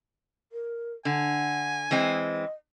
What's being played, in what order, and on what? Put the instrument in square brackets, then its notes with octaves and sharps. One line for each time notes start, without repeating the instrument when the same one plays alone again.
[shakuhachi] A#4
[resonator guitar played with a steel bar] D3 [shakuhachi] F#5 [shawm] G#5
[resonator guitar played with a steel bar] E3 G#3 C4 [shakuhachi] D#5